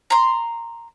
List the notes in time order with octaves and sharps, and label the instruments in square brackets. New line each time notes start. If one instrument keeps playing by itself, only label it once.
[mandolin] A#5 C6